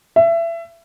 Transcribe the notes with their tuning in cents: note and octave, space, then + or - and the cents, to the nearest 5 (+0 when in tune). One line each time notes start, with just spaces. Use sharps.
E5 +25